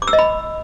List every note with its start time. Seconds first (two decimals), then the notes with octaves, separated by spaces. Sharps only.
0.02 D6
0.08 E6
0.13 D#5
0.19 B5